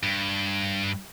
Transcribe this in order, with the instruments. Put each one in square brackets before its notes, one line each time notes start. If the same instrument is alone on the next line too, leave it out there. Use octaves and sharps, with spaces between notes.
[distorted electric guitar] G2